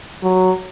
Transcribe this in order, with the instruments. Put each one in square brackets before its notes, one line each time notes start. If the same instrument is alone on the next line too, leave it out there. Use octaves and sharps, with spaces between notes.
[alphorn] F#3